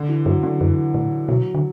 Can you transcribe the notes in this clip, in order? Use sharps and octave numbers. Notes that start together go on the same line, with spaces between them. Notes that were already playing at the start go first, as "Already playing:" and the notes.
Already playing: D3
E3
G2 F#3
D3
F#2 E3
A2 E3
B2 F#3
D3